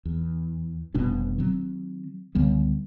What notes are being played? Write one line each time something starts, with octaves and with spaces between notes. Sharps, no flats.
E2
F1 B2 G3 D4
D#3 F#3 C4
C#2 D3 G3 B3